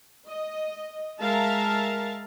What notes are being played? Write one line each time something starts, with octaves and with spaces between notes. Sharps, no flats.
D#5
G#3 A#4 E5 F5 A5 A#5